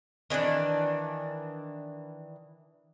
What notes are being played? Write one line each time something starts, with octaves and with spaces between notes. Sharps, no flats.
D#3 E3 D4 D5